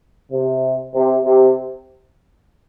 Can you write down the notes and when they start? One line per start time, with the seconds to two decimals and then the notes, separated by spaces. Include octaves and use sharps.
0.31 C3
0.95 C3
1.25 C3